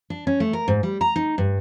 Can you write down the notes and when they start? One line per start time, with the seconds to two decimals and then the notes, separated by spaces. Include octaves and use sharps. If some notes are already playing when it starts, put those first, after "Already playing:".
0.10 D4
0.27 C#4
0.40 A3
0.53 A#4
0.68 G#2
0.83 G3
1.01 A#5
1.16 D#4
1.38 G2